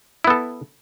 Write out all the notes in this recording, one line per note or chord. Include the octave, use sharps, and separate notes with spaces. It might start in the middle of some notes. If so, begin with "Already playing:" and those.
B3 E4 A4